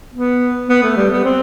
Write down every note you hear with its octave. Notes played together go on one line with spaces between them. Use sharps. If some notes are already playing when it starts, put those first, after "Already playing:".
B3
B3
A3
G3
B3
C4